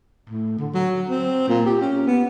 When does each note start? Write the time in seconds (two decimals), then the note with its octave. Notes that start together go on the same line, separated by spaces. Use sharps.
0.30 A2
0.59 D3
0.74 F#3
1.09 C4
1.48 A#2
1.66 G4
1.81 C#4
2.07 B3